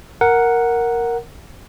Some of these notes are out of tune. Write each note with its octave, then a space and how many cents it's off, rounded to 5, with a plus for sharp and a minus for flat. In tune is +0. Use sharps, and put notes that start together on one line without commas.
A#4 +0 F#5 +0